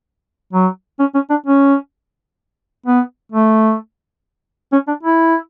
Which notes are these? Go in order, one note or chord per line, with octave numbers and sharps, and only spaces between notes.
F#3
C#4
C#4
D4
C#4
B3
A3
C#4
D4
E4